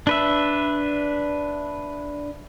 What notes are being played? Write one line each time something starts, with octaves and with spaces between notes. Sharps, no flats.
D4 B4 E5